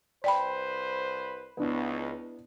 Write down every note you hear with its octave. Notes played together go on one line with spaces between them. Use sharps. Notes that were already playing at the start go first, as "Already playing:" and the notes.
C2 B4 C5 D5 G5 B5
C#2 B3 D4 E4